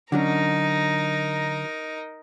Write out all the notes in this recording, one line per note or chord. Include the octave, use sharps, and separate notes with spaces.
D3 F#3 C#4 D#4 A#4